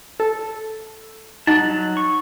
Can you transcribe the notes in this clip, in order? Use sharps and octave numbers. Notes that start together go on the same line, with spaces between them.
A4
G3 D#4 F#4 A5
F#3
C#6